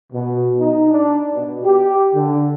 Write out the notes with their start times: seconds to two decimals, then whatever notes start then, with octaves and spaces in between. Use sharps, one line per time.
0.13 B2
0.60 D#4
0.91 D4
1.34 B2
1.64 G4
2.14 D3